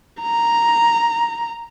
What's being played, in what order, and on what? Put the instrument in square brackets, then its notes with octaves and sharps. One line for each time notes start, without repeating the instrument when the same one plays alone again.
[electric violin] A#5